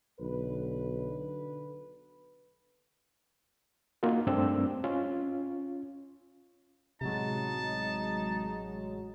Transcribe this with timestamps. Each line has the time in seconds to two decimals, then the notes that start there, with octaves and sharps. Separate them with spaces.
0.20 B1 D3 B4
4.03 A#3 D#4 F4 F#4
4.27 G2 A3 C4 D4 E6
4.84 C#4 F4
7.01 A1 C3 F#3 G#3 D#4 A5